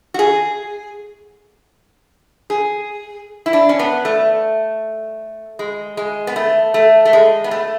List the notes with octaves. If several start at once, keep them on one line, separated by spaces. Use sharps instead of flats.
F#4
G#4
G#4
E4
D4
C#4
B3
A3
G#3
G#3
B3
A3
A3
A3
G#3
B3
A3